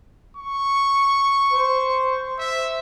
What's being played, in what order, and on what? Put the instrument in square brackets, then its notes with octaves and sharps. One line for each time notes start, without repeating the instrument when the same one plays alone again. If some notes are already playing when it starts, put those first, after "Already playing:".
[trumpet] C#6
[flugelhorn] C5
[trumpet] E5